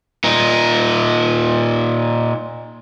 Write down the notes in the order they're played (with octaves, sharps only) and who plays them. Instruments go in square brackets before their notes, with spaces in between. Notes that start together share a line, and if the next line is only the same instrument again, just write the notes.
[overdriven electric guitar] A#2 D#4